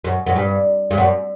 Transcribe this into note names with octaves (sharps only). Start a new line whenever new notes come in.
F#2
F#2
G2
G2
F#2